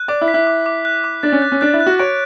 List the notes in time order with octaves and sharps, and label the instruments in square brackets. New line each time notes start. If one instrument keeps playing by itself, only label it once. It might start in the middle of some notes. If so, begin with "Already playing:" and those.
Already playing: [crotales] F#6
[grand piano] D5 [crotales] D6
[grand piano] E4
[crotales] B6
[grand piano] E4
[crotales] D6
D6
F#6
D6
[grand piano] D4 [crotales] A6
[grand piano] C#4
[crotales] F#6
[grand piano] C#4
[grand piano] D4 [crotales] F#6
[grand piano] E4
[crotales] F#6
[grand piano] F#4
[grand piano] C#5 [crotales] D7